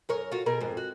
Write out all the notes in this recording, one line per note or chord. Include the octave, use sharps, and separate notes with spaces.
F#2 A#4 C#5
F4 F#4
B2 G#4 A#4
F2 G#2
F#4